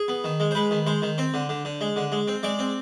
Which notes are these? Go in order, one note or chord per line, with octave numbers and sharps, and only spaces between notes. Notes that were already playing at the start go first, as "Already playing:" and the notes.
Already playing: G#4
B3
D#3
G#3
C5
G#3 B4
D#3
G#3 C5
D#3
C4 C5
D3
D3
D3
G#3
D3
G#3
C4
G#3 D5
C4